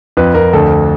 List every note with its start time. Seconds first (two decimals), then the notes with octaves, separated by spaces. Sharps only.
0.17 F2 B4
0.35 F2 A#4
0.53 D2 A4